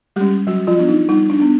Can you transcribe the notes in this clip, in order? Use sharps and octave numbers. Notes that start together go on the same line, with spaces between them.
G3 G#3 C#4 G4
F#3 G3 F#4
F3 F4
B3 D4
D#4
G3 D#4
D4
B3 D4